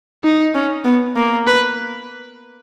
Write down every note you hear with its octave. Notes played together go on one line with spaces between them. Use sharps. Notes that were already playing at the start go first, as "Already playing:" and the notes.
D#4
C#4
B3
A#3
B4